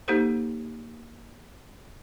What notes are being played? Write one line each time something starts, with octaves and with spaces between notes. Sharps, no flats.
A#3 D#4 G4 A4 C5